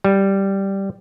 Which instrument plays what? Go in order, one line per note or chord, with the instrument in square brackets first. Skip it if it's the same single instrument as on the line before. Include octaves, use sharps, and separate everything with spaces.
[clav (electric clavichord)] G3